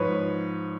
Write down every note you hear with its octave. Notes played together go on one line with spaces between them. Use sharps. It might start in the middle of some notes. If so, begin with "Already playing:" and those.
Already playing: G#2 F3 B4 C#5